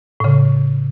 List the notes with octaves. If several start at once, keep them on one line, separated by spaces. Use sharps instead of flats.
A2 C#3